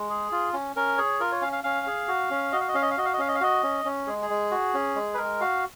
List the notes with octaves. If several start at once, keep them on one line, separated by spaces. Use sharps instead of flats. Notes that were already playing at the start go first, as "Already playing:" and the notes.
Already playing: G#3
G#4
F4
C#4
C#4 A#4
G#4 C#5
F4 A#4
C#5
C#4 F5
F5
C#4 F5
G#4
F#4
C#4
F#4 D#5
F5
D#5
C#4 F5
D#5
F5
F#4 D#5
F5
D#5
C#4 F5
D#5
F5
F#4 D#5
C#4
C#4
G#3 G#4
G#4
G#3
F#4
C#4
G#3
B4
G#3 A#4
F#4 F5